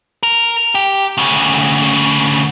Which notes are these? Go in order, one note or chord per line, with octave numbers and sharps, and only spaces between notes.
A#4
G4
D2 C#3